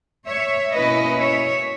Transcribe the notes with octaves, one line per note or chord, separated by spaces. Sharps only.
C#5 E5
B2 A#3 C#4 E4 B4 D#5
C#5 E5